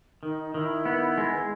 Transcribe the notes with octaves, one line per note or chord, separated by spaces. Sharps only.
D#3 D#4
D#3 E4
B3
G#3